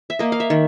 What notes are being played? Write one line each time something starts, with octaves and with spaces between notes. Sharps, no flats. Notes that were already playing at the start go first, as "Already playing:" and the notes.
E5
A#3 D#5
F5
E5
D#3